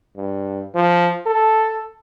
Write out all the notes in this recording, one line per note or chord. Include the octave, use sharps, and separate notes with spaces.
G2
F3
A4